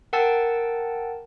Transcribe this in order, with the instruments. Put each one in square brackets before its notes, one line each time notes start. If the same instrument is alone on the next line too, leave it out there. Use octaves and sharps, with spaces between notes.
[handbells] A#4 F#5 G5 A5 E6 A6